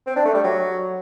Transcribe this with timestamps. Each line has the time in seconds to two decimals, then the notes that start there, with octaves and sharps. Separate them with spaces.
0.07 C4
0.16 D4
0.25 A3
0.34 G3
0.43 F#3